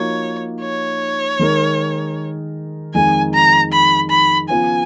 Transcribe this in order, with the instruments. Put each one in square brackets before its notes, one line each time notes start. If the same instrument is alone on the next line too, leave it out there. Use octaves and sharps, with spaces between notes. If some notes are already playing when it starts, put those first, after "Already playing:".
Already playing: [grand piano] F3 A#3 D#4 F#4 [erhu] C#5
[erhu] C#5
[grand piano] D#3 G#3 D#4 A#4
[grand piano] F2 D#3 G#3 D#4 [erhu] G#5
[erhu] A#5
B5
B5
[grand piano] C#3 F3 B3 F4 [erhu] G#5